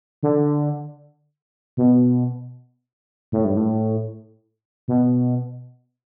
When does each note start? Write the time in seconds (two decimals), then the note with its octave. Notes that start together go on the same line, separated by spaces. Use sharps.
0.23 D3
1.77 B2
3.32 A2
3.45 G2
3.57 A2
4.88 B2